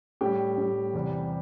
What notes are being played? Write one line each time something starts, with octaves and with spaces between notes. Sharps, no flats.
A2 G3 G4
A2 G3
E2 C3 G3